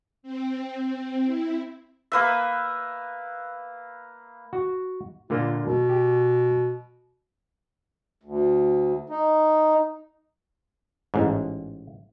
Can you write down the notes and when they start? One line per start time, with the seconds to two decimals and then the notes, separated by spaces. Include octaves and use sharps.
0.23 C4
0.78 C4
1.24 E4
2.12 A#3 B4 E5
4.53 F#4
5.30 A#2 D3 A#3 F4
5.60 B2
5.89 G4
8.23 D2
9.09 D#4
11.14 A1 G#2